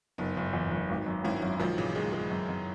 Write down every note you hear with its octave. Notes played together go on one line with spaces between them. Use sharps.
F#1 B3 D#4
F#1
E2
F#1
G#1
F#2
G#1 C#4 E4
F#2 C#4 E4
A#1 D#3 F#3
A#2 C#3 E3
D#3 G#3
G#3
F#2
F#2